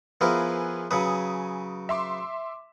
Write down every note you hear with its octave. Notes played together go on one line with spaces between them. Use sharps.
F3 B3 E4 G#4 A#4 B4
C#3 F#3 B4 G#5 D#6
E5 C6 D6